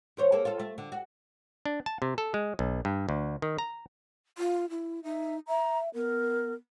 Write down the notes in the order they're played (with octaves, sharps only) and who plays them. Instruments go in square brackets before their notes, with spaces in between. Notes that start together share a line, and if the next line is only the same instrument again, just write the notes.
[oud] E2 C5 C#5
A#3 G#4 A4
F4 A4
A3
D3
F#4
[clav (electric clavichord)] D4
A5
C3
A4
G#3
B1
G2
D2
D#3
A#5
[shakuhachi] F4
E4
[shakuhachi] D#4 [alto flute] E5
[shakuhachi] E5 [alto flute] A#5
[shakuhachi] B3 [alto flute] A#4